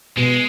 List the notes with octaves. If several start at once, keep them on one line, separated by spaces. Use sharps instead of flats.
B2 G#3